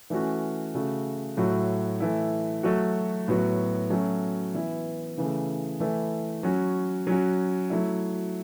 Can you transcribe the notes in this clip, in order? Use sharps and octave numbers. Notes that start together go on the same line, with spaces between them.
E3 A3 C#4 F#4
C#3 A3 F#4
A2 F#3 A3 F#4
E3 A3 E4
F#3 A3 F#4
A2 F#3 B3 F#4
F#3 A3 C#4 F#4
E3 B3 E4
C#3 E3 A3
E3 A3 E4
F#3 C#4 F#4
F#3 C#4 F#4
F#3 A3 E4